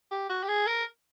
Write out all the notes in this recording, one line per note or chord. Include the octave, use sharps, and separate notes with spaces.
G4
F#4
G4
G#4
A#4